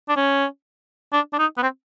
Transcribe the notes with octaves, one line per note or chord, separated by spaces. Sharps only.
D4
C#4
D4
D4
D#4
B3
C4